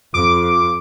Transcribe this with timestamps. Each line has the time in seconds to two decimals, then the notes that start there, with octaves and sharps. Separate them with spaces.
0.14 F2 F4 D6